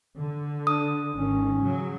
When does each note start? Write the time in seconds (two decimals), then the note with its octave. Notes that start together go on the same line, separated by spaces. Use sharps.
0.16 D3
0.67 D4 D#6
1.14 G#1 D#3 C#4
1.62 C#3 F#3